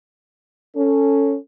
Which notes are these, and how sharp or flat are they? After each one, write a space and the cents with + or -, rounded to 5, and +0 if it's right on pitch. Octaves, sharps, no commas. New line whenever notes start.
C#4 +0 A4 +15